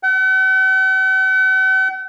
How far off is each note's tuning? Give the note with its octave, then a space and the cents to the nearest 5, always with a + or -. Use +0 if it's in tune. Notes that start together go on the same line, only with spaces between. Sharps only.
F#5 +45